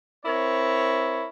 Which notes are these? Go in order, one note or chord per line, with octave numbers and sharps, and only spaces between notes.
C4 E4 A#4 C#5